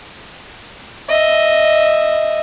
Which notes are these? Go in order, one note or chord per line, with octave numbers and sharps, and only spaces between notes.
D#5 E5